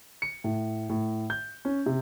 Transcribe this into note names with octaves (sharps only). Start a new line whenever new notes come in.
C#7
A2
A2
G6
C#4
C3